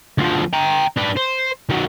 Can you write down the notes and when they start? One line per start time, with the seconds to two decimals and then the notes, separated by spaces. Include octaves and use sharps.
0.18 D2 F3
0.53 G5 A#5
0.97 D4 B4
1.17 C5
1.70 D#3 F#3